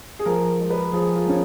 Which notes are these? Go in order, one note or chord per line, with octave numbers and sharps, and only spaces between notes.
G#4
F3 A#4
G#3
B4
F3 G#4
F4
F3 C#4